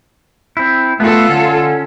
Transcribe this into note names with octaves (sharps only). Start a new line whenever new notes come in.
C4 E4
A3 B3 F4 F#4 A4
D3 C#4